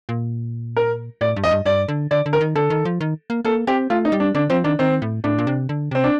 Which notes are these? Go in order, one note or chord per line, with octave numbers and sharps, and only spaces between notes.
A#2
A#4
A2 D5
G2
F2 D#5
G2
G2 D5
D3
D3 D5
D3
A#4
D#3
D3 A4
D#3
F3
D#3
A#3
A#3 A4
C4 G4
A3 F4
D#4
G3
D4
D3 D4
F3 C4
D#3 D4
D#3 C4
A2
A2 D4
A#2
C3
D3
C3 C4
D4